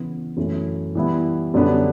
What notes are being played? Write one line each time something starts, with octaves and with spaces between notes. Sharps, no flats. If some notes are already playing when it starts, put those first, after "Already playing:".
Already playing: C#3 E3 B3
F#2 E3 A3
E3 G3 B3 E4
F#2 D3 G3 B3 D4